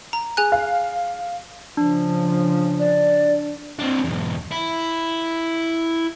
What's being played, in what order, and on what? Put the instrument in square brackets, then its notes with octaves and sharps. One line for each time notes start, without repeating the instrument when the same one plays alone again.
[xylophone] A#5
G#4 G#5 F#6
[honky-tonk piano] F5
[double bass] C#3 F3 [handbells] D4
[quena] D5
[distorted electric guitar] C4 D4
B1 E2
E4